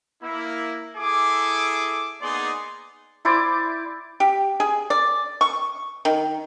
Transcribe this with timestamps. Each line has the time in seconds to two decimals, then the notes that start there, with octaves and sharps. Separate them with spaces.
0.22 A#3 E4
0.97 E4 G#4 A4 D6
2.21 A#3 B3 D#4 G#4 D5 C6
3.25 E4 C5 D5 D6
4.20 G4
4.60 G#4
4.90 D5
5.41 C#6
6.05 D#3